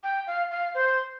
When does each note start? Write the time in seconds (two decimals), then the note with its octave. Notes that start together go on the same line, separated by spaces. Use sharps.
0.03 G5
0.27 F5
0.51 F5
0.75 C5